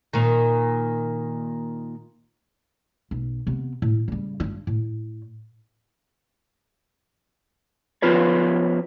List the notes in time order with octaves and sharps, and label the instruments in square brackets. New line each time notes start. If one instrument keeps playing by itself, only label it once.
[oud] A#2 D#3
[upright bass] B1
C3 B3
A2
C#3 G3
G2 E4
A2
[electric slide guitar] F3 B3 F4 B4 C#5